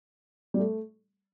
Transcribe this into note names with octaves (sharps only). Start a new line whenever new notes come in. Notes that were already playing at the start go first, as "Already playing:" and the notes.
G3
A3